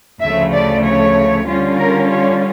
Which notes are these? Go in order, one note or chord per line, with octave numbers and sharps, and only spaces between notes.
D2 C#3 F3 A3 E5
D5
C#5
D3 G3 C#4 F4
A#4
C#5